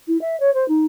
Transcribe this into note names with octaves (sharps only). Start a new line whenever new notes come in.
E4
E5
C#5
C5
D#4